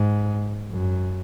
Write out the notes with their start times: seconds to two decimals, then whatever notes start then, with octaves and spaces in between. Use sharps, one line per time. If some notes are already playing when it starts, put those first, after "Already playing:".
Already playing: G#2
0.71 F#2